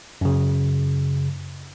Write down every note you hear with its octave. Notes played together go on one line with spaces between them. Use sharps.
F#2 C#3